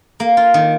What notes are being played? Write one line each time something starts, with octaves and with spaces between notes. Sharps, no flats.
A#3
F4
D#3